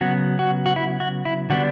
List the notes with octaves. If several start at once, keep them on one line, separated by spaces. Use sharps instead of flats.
C#3 F#3 B3 F#4
F#4
F#4
E4
F#4
E4
D3 G3 B3 D4 F#4